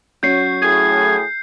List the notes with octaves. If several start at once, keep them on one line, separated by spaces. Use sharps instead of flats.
F#3 C#4 C#5 G6 C7
A2 G#4 G#6